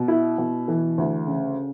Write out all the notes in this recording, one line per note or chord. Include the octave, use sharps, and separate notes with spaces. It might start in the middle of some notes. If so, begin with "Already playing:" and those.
Already playing: B2
E4
B2
E3
D2
C#3